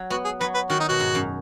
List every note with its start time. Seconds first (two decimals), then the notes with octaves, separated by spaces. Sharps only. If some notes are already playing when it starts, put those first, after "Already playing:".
Already playing: F#3
0.10 B3 F#4
0.25 G#4
0.40 F#3 B4
0.55 B4
0.70 D#3 F#4
0.80 D#4
0.89 B2 F#4
1.00 G#2
1.15 F#2